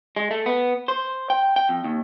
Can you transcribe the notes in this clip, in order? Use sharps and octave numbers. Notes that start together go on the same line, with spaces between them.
G#3
A3
B3
C5
G5
G5
F2
D#2